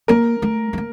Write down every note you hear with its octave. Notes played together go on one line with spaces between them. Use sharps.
A#3 A#4
A3
A3
A#3